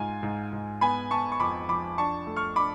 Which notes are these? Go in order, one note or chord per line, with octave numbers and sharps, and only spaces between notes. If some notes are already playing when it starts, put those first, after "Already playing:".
Already playing: G#2 F4 G#5
G#2
G#2
B3 G#5 B5
B3 A5 C#6
C#6
F2 B5 D6
F3 B5 D6
D4 A5 C#6
A3
C#6 F6
D4 B5 D6